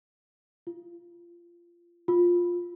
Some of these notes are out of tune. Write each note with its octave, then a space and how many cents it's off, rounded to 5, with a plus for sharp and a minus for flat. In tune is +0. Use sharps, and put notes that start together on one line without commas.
F4 -20
F4 +10